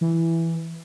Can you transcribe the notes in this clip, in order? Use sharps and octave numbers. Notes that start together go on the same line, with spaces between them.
E3